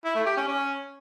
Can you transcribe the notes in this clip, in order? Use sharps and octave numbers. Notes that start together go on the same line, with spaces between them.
E4
A3
G4
C#4
C#4